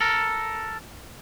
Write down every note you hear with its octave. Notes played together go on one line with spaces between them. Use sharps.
A4 A#4